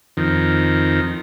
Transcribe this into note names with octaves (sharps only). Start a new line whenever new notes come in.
F2 D#3